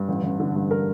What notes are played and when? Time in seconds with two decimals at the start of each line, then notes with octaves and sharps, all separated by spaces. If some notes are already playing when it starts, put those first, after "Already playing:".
Already playing: G2
0.08 A1
0.23 A1
0.40 D3
0.56 G2
0.71 A#4